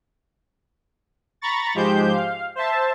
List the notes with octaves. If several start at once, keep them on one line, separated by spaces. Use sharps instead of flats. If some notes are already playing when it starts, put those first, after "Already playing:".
A#5 B5 C#6 A6
G#2 F3 G#3 G4 C5 G6
F5
C5 E5 A5